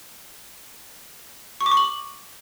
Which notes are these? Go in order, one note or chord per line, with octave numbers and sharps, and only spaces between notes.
C#6
D6
C#6
F#7